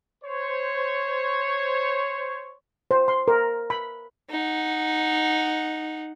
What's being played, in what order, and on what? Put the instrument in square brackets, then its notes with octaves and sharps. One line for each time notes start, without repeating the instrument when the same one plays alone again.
[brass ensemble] C5 C#5
[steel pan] C5
C6
A#4
B5
[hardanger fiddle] D#4 F#5